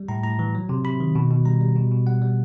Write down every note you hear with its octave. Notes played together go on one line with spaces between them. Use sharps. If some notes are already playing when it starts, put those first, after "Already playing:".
Already playing: G3
A2 A#5
A2 A#5
E3
F#3
C3
C3 B5
D#3
B2
B2
G3 A#5
G3
B2
B2
G3 F#5
G3